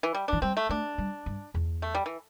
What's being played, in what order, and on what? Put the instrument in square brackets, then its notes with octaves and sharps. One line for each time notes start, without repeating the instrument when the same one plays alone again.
[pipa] E3
G3
[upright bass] E3 [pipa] D4
[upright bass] G3 [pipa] C4
[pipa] A3
[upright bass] A3 [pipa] D4
[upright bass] G3
G2
E2
[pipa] A3
G3
E3